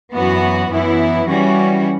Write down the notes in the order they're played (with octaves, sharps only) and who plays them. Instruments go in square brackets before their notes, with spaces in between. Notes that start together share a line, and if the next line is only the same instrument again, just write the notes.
[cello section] F#2 E3 B3 F#4
F#2 E3 B3 E4
E3 G3 C#4 F#4